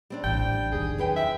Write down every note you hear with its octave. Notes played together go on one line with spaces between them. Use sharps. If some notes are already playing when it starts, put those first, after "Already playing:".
G3 C4 D4
A1 G5
E2 D#3 G#4
F#2 B4 G5
E5